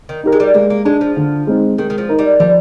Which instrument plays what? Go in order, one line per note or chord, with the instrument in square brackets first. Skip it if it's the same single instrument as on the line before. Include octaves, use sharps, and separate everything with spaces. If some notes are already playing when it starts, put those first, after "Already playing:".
[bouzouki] D#3
[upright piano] D#4 G4 A#4
[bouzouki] G#3
G3
[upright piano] G#3 [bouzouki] A#3
[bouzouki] A#3
[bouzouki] G#3 [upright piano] D4 G#4
[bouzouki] F3
[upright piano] D3
G#3 C4 D#4
[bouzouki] D#3 [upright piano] G#3
[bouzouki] D#3
F3
[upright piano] D#4 A#4
[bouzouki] G3
[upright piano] F3 [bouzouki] G3